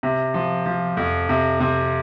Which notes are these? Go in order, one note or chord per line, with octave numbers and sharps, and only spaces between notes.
C3
F3
F3
F2
C3
C3